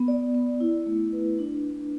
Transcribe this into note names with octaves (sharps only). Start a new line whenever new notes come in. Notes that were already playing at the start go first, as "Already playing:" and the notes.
Already playing: B3
D5
B3
E4
A3
B4
D4